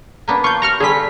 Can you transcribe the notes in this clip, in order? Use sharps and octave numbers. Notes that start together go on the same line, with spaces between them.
A#3 B3 D4
F4 C#6 G6
G4 A#5 C#6 F6
D3 G3 F4 G#4 B6